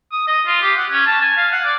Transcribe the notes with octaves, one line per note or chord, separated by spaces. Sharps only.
D#6
D#5
F4
G4
F#5
C#4
A5
G#5
F5
F#5
D5